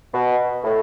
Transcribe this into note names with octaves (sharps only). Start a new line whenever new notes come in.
B2
A2